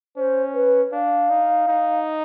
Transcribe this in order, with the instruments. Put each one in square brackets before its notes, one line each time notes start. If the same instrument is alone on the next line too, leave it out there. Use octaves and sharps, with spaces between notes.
[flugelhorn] C#4 [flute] C5
[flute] B4
[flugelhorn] D4 [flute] F5
[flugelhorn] D#4
D#4